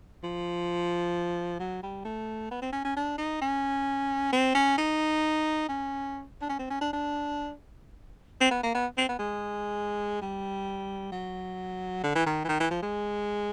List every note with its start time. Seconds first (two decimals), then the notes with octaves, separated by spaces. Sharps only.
0.24 F3
1.59 F#3
1.83 G3
2.05 A3
2.51 B3
2.62 C4
2.73 C#4
2.85 C#4
2.96 D4
3.18 D#4
3.41 C#4
4.32 C4
4.55 C#4
4.78 D#4
5.69 C#4
6.41 D4
6.49 C#4
6.59 C4
6.70 C#4
6.81 D4
6.93 D4
8.41 C4
8.51 B3
8.63 A#3
8.74 B3
8.97 C4
9.09 B3
9.19 G#3
10.22 G3
11.12 F#3
12.04 D3
12.15 E3
12.26 D#3
12.44 E3
12.49 D#3
12.60 E3
12.71 F3
12.83 G#3